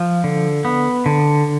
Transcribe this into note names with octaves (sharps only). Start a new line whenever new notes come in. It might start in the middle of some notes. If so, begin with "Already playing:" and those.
Already playing: F3
D3
B3
D3